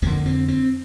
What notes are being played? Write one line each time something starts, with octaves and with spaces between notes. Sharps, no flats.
F2 D3 A#3
C4
C4